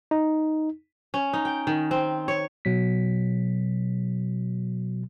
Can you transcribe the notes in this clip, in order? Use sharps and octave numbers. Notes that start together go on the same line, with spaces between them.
D#4
C#4
D#4
G5
D#3
C4
C#5
B2 F#3 B6